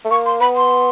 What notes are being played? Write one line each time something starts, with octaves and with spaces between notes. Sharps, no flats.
A3
A#3 C#6
C6
B3 B5
C6